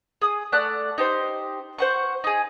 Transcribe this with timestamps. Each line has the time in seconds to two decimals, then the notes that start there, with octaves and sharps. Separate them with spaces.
0.22 G#4 D#6
0.52 A3 D5 F#5 F#6
0.98 D#4 G4 C5
1.78 C5 F#5 C#6
2.24 D#4 G#4